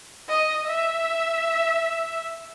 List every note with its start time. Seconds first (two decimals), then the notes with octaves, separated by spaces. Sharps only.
0.29 D#5
0.66 E5